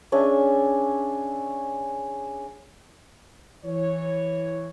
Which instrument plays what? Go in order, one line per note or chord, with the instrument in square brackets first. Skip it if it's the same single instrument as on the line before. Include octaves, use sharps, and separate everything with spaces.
[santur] C#4 D4 G#4 E5
[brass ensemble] E3 C#5